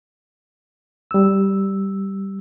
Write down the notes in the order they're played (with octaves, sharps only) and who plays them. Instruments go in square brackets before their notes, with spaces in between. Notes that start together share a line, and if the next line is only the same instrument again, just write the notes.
[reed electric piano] G3 E6